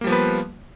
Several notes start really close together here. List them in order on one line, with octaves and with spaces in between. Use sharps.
A#3 G3 F3 B3 B4